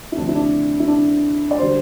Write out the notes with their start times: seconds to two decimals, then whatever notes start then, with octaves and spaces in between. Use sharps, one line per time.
0.12 E4
0.17 D2 C3 F3 D4
0.28 E4
0.35 D4
0.80 E4
0.88 D4
1.51 D5
1.58 D3 G3 C5